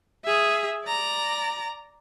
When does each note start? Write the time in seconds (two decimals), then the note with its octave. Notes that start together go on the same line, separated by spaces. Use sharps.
0.24 G#4 E5
0.84 D5 A#5